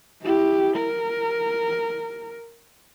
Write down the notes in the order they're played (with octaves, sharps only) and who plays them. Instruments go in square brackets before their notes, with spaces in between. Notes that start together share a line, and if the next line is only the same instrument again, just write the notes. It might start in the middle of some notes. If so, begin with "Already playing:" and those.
[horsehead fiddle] E4 G4
A#4